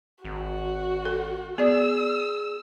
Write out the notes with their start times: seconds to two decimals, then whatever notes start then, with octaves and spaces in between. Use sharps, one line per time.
0.25 G#1 F#4
1.05 A4
1.58 B3 G#4 D5 E6